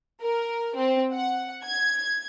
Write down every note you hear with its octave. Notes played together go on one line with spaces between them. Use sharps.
A#4
C4
F#5
G#6